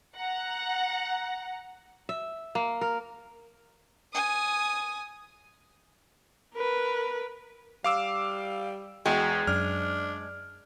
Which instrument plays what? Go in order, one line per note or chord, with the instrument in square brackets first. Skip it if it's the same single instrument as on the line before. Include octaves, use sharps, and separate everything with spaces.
[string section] F#5 A#5
[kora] E5
A#3
A#4
[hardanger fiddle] G#5 D#6
[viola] A#4 B4
[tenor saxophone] G3 [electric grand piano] F5 D6 E6
[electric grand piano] E2 G5 [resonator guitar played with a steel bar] G#3 [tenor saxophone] F#4
[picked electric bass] F#2 [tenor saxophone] D4 [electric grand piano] F6